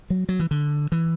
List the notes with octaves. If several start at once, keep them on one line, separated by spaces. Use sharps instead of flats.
F#3
F#3
E3
D3
E3